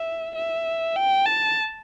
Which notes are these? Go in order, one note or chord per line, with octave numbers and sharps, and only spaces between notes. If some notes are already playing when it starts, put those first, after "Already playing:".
Already playing: E5
E5
G5
A5